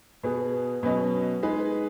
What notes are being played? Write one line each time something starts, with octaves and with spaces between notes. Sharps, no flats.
B2 B3 G#4
B2 F#3 C#4 B4 D#5
G#3 D#4 G#4 B4